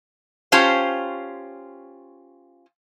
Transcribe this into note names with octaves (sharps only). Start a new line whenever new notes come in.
C#4 F4 G4 C5 F5 A5